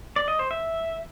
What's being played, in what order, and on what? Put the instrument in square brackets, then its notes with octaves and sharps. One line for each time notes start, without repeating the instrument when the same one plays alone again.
[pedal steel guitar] D5
D#5
C5
E5